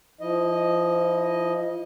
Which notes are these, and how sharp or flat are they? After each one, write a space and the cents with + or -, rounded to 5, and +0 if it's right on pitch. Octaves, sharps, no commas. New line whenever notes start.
F3 -20 E4 -35 D#5 +0